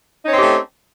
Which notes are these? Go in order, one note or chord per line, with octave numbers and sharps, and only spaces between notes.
A3 C4 C#4 D#4 G4